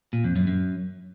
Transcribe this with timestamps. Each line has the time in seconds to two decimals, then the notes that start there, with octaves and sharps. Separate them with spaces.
0.13 A#2
0.24 F2
0.36 F#2
0.47 F#2